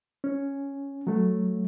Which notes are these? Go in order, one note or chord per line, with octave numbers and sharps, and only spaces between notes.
C#4
F#3 A3